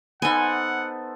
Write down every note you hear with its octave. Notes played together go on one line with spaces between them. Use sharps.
B3 D#4 A4 C5 F#5 G#5